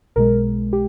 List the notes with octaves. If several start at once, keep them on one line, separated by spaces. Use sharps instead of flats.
B1 B2 G#3 A#4
G4